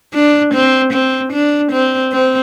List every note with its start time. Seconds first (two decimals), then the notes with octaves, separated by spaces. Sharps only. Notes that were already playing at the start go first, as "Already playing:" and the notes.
0.14 D4
0.54 C4
0.93 C4
1.33 D4
1.72 C4
2.12 C4